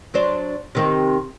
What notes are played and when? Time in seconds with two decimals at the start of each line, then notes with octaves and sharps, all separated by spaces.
0.14 F#3 D4 C5
0.75 C3 D#3 C4